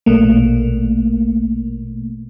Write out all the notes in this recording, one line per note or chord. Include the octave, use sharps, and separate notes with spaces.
A#1 B2 A3 A#3